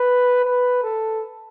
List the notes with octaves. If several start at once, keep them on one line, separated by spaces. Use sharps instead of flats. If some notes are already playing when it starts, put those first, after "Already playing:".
Already playing: B4
B4
A4